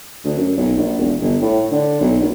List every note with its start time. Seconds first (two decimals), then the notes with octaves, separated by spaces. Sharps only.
0.25 D2
0.37 F#2
0.57 B1
0.77 A#1
0.99 E1
1.21 G1
1.41 A2
1.71 D3
2.01 B1
2.21 A#1